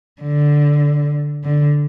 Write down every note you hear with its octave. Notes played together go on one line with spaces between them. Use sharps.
D3
D3